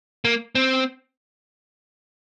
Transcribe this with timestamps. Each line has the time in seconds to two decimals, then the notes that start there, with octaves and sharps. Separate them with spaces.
0.25 A#3
0.55 C4